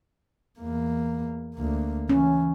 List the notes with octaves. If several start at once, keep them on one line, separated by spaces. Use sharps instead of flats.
E2 A#3
D2 A#3
E3 C#4